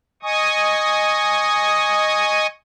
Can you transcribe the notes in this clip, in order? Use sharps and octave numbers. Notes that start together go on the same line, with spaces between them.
D#5 G#5 C#6 D#6